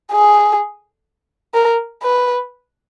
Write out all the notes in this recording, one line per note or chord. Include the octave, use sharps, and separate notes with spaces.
G#4
A#4
B4